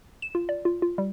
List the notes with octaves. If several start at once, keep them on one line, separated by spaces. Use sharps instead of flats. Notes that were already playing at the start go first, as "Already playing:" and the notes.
E7
F4
D5
F4
F4
G3